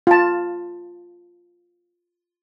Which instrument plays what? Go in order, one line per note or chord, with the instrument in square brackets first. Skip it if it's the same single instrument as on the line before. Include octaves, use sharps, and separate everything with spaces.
[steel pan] F4 A5